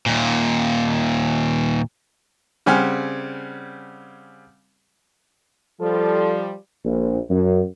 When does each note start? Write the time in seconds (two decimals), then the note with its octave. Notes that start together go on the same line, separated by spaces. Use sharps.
0.06 D#2 A#2
2.66 C#3 G3 C4 F#5 G#5 F6
5.81 F3 G3 A4
6.84 A#1
7.29 F#2